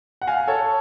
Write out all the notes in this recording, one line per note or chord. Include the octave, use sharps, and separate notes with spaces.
F#5
F5 G#5
A4 C#5